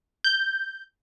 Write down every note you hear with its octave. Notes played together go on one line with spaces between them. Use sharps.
G6